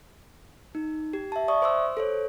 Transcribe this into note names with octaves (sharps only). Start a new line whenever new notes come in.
D#4
G4
E5 A5
D5 E5 C#6 D#6
C5 C6 D6 E6
A4 C5 C#5